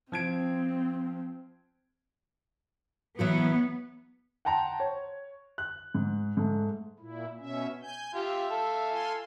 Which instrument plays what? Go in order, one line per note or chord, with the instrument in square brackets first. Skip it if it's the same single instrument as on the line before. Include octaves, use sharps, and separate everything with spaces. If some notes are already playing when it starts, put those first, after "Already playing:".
[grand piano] F3 G#6 D7 [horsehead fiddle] C4
[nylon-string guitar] E3 F#3 F#4 [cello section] B3
[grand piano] F#5 G5 A5 A#5 C6
C#5
F#6
G#2
G#2 A3
[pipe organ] A#2 E4
B2 C#4 E5
G#5 G6
[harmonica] F4 G4 [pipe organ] E5
[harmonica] A4 F5
[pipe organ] F4 G#5 C6